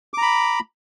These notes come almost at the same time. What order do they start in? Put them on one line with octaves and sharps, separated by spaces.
D6 A#5 B5